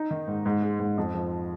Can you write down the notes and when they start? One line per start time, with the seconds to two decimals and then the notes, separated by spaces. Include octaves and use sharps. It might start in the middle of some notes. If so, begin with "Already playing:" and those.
Already playing: D#4
0.11 D#3
0.28 G#2
0.46 G#2
0.62 G#3
0.80 G#2
0.98 F2
1.14 F3